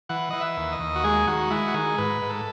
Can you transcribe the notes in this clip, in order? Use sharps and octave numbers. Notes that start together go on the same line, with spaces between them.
E3 F#5
E3 D#5
E5
D#2
D#5
D#2
F#4
G#3 G#4
D#3 F#4
G#3 E4
F#4
D#3 G#4
G#2 B4
G#2
A4